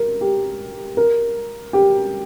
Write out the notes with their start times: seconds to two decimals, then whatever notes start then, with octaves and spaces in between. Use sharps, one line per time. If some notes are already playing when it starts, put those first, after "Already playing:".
Already playing: A#4
0.21 G4
0.97 A#4
1.73 G4